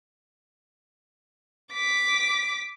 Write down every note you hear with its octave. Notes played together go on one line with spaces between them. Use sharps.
D6 B6